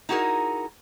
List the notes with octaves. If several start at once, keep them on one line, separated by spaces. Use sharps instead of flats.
D#4 E4 F#4 G#4 A#4